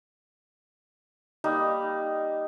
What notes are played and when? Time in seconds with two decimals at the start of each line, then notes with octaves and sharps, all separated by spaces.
1.44 G3 A#3 D#4